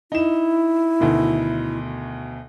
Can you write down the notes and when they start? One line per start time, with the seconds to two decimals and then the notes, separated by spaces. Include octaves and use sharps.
0.12 D#4 E4 E7
1.00 D2 B2 D#3